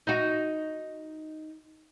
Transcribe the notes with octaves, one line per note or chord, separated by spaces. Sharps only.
D#4 F#4